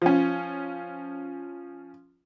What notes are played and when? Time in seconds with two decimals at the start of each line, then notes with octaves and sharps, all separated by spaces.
0.02 F3 C#4